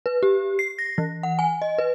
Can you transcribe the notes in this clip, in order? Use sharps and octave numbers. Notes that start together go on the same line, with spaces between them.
B4
G4
C7
A#6
E3
F#5
G#5
D#5
B4